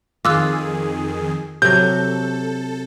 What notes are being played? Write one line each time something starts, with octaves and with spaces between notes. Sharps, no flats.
F2 D#3 F4 G#4 D6 E6 F#6
C3 F#3 A4 G6